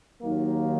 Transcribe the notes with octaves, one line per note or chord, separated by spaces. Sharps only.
D#2 D#3 F#3 A#3